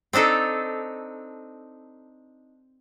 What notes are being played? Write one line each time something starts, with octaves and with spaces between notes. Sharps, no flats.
C4 D4 D#4 A4